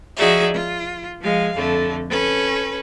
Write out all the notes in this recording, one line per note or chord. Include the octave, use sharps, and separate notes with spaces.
F3 D#4 F#4 G#4 D5 E5
F4
F3 G#3 F5
F2 D3 A3
C#4 A4 B4